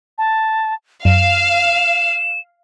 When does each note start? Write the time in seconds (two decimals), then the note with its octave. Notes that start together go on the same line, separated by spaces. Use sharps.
0.18 A5
1.05 F#2 F5 E7